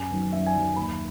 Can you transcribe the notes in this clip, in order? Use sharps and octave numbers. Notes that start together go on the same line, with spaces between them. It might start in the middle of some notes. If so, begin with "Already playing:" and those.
Already playing: F#2 G#5
D#3 F#3 B3
F#2 E5
G#5
D#3 F#3 B3
D#2 B5